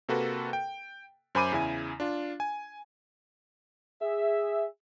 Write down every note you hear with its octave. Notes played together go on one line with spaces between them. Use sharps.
C3 A#3 F#4 A4 B4
G5
F#2 C5 G#5 B5 D6 D#7
E2 C#3 E4 G#5
D4 F4
G#5
G#4 E5